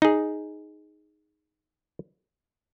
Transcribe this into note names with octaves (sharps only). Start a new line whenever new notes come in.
D#4 G#4